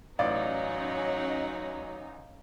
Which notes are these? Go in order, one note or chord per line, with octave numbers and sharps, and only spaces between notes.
A1 F#3 C#4 D#4 D5 F5